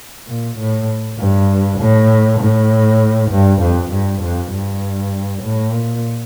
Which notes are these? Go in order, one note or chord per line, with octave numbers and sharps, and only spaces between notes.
A#2
A2
G2
A2
A2
G2
F2
G2
F2
G2
A2
A#2